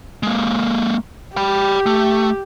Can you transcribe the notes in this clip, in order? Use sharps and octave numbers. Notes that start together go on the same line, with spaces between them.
G#3 A#3
G4 G5 B5
A3